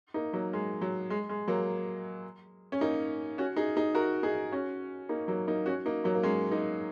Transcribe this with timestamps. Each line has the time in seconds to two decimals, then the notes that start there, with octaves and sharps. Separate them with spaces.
0.14 A#3 D#4
0.33 F#3 A#3
0.53 G#3
0.81 F#3
1.10 G#3
1.29 G#3
1.48 F#3 A#3
2.72 C#4
2.81 A#3 D#4
3.38 C#4 F#4
3.56 D#4 G#4
3.76 D#4 G#4
3.95 F#4 A#4
4.23 D#4 G#4
4.52 C#4 F#4
5.09 A#3 D#4
5.28 F#3 A#3
5.47 A#3 D#4
5.66 C#4 F#4
5.86 A#3 D#4
6.04 F#3 A#3
6.15 A#3
6.23 G#3 C#4
6.51 A#3 D#4